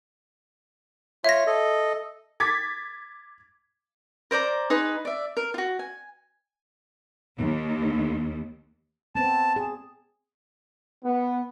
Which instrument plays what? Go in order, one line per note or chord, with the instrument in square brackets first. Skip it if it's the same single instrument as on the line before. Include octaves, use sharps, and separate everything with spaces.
[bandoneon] F4 C#5 [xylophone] E5 A#6
[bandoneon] A4 D#5
[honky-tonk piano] D6 G#6 A6 B6
[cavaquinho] A#4 C5 D5 A#5
D#4 G#4 B4 C6
D5 E5
A#4
F4 F#4
G#5
[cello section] D#2
[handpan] B3 C4 [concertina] A5
[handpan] G#4
[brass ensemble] B3